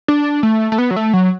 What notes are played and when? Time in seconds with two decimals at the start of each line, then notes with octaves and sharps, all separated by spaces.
0.08 D4
0.43 A3
0.72 A3
0.78 B3
0.91 F#3
0.96 A3
1.13 F#3